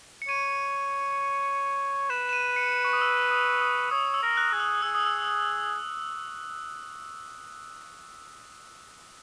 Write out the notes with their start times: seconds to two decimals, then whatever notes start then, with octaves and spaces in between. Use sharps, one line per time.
0.22 C#7
0.28 C#5 D#7
2.10 B4 E7
2.29 E7
2.33 D#7
2.56 C#7
2.85 C#6
2.93 D#6
3.01 E6
3.31 D#6
3.61 D#6
3.91 C#5 D#6
4.14 E6
4.22 A#4
4.37 F#6
4.53 G#4
4.60 E6
4.82 G#4 E6
4.95 D#6
5.06 E6